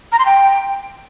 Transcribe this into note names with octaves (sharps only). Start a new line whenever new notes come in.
A#5
C6
G5